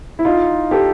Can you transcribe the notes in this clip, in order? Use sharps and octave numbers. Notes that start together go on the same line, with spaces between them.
E4
D#4 F4
G4 A4